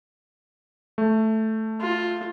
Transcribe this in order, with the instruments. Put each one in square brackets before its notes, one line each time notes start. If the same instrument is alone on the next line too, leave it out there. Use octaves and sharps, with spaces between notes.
[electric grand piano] A3
[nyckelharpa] F4